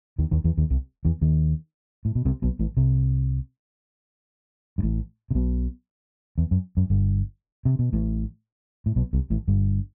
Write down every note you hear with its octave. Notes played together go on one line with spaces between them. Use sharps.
D#2 D#3
D#2 D#3
E2 E3
D#2 D#3
C2 C3
E2 E3
D#2 D#3
A2
B2
C2 C3
B1 B2
A1 A2
C2 C3
G2
A1 A2
C3
B1 B2
E2
F#2
F#2
G1 G2
C3
B2
A1 A2
A2
B1 B2
C2 C3
A1 A2
G1 G2